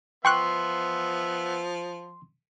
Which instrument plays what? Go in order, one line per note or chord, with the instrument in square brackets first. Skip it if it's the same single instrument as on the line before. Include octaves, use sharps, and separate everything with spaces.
[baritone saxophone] F3 [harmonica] B3 E5 [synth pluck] G5 C#6 F#6 [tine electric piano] C6